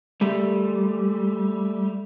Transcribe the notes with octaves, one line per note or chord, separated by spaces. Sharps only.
G3 A3